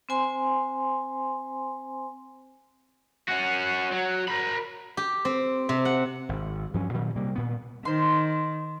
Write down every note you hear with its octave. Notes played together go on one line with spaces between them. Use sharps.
C4 C5 G#5 C6
C#4 F#4
F#3
A#4 B5
G4
C4
C3
F#5
G#1
G2 F3 F#3 C#4
G2 A#2 D#3 F#3
C3 G3 A#3
A#2 B3
D#3 C5 C6